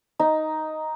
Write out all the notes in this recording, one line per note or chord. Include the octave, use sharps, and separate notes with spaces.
D#4